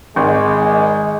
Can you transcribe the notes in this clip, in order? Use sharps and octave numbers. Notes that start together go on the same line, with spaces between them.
G#1 G#3